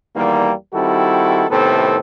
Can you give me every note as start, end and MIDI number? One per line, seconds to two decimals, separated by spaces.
0.16 0.52 40
0.16 0.52 51
0.16 0.52 55
0.16 0.52 58
0.74 1.46 51
0.74 1.46 55
0.74 1.46 60
0.74 1.46 64
0.74 1.46 66
0.74 1.46 69
1.51 1.99 45
1.51 1.99 48
1.51 1.99 51
1.51 1.99 59
1.51 1.99 60
1.51 1.99 69